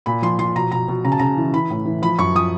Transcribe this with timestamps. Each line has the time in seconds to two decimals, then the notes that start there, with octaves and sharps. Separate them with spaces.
0.06 A#2 B5
0.22 F3 C6
0.39 F3 C6
0.56 B2 A#5
0.72 B2 A#5
0.88 B2
1.05 C#3 A#5
1.12 A5
1.19 C#3 A#5
1.37 E3
1.53 E3 B5
1.70 A2
1.86 E3
2.02 F3 B5
2.19 F#2 C#6
2.35 F3 D#6